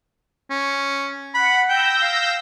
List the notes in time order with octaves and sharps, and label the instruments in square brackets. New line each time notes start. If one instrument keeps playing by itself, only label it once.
[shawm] C#4
[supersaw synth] F#5 [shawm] B5
[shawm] G5 [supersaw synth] E6 G6 A#6
[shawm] F5